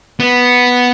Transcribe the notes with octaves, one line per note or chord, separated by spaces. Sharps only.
B3